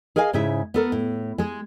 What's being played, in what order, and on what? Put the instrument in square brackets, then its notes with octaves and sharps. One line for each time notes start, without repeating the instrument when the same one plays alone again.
[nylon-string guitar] G#4 A#4 D#5 F5 G#5
G#2 C#3 E4 G#4 E5
B3 A4 A#4
A2
G#3 G#4